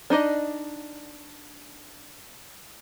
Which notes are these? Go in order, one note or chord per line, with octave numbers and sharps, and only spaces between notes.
D4 D#4 D5 D#5